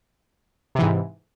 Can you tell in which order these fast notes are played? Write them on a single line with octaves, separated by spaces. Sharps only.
C3 E3 G#2